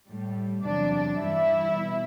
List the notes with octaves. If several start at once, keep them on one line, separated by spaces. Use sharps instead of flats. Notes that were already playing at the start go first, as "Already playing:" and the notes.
A2 G3
E2 C3 F#3 D4 D5
G2 E3 G3 E4 E5
B2